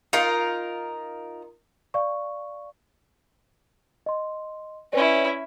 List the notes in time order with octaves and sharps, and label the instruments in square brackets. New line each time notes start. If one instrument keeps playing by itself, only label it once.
[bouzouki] D#4 F4 A#4
[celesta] D5 F5 C#6
D#5 C6
[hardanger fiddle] C#4 E4 [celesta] B4 C#5 D5